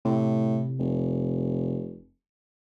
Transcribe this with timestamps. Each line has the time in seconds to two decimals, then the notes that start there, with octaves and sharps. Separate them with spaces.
0.05 A2 C3
0.79 F1